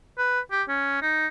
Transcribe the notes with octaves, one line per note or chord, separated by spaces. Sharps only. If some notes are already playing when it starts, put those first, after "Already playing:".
B4
G4
C#4
D#4